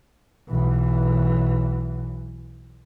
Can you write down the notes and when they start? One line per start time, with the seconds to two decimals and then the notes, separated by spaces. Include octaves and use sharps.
0.49 B1 E3